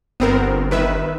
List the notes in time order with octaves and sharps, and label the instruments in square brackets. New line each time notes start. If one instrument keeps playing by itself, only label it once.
[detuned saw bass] G1 [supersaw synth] B3 C4 A#4
[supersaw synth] D#3 B4 E5